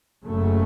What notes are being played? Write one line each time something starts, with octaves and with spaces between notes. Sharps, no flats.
F#1 F#2 C#3 F#3 A3